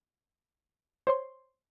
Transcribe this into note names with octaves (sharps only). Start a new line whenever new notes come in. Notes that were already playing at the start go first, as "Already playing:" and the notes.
C5 C#5 C6